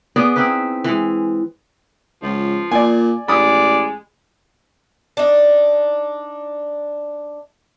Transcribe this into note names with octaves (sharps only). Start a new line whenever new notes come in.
B3 G#4 D5
C4 D#4 E4 B4
E3 G#3
C#2 F3
A#2 D5 G#5
A1 G#3 D5 B5 D#6
D4 D#4